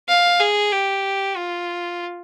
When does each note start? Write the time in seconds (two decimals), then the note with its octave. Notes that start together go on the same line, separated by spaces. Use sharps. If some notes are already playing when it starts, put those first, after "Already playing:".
0.08 F5
0.40 G#4
0.72 G4
1.37 F4